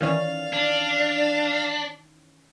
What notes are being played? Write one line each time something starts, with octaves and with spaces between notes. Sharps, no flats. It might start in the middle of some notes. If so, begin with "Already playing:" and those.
D#3 E3 C#4 D5 F5
D4